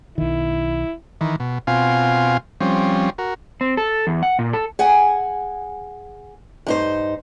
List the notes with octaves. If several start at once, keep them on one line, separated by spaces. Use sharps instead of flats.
B1 D#3 E4
D#3 E3
B2
B2 C4 F4 F5 G#5
F3 G3 C4 C#4
F#4 A#4
C4
A4
E2
F#5
A#2
A4
G#4 F#5 G#5
G2 D#4 C5